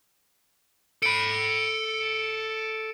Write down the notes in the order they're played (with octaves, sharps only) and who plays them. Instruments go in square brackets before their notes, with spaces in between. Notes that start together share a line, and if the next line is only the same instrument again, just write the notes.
[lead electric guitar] A4 B5 [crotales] C#7 D7